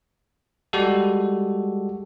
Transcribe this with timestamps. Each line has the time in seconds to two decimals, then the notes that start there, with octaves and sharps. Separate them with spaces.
0.73 G3 G#3 F#4 G4 A4